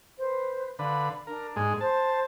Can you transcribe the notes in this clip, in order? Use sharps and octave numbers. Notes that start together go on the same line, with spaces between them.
B4 C5
D3 B4 F5 B5 C6
D4 A#4
G#2 G#3
C5 A5